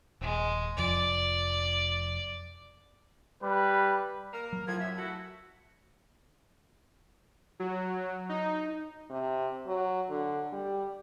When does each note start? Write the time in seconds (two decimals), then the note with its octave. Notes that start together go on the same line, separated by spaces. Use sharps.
0.21 D#1 G#3
0.77 F1 F2 F3 D5
3.42 G3 B4
4.33 A#3 A#4
4.53 F#3
4.67 A2 F3 G#6
4.79 F#2 E5
4.97 A3 E4 F#4
7.60 F#3
8.29 D#4
9.10 C3
9.67 F#3
10.10 D3
10.53 G3